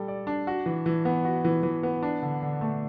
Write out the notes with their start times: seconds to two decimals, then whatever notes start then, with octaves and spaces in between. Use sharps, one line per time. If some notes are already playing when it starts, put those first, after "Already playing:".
Already playing: G3 A4
0.08 D5
0.27 D4
0.47 F#4
0.66 E3
0.86 E3
1.05 B3
1.25 F#4
1.45 E3
1.63 E3
1.83 B3
2.03 D4
2.23 D3
2.42 D3
2.61 A3